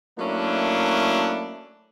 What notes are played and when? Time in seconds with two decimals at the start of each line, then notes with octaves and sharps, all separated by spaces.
0.19 F#3 A3 A#3 C#4 D4 E4